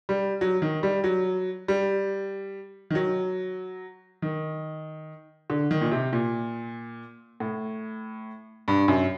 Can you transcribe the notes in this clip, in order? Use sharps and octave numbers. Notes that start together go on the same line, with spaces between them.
G3
F#3
D#3
G3
F#3
G3
D#3
F#3
D#3
D3
D#3
A#2
C3
A#2
A2
G2
F#2